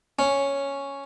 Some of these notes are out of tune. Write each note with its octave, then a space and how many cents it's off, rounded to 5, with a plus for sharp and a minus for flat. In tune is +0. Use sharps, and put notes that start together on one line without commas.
C#4 +0